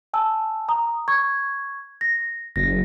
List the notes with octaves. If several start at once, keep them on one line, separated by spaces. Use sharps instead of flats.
G#5 A5 E6
A#5 D#6
C#6 G#6
A#6
F#1 A#6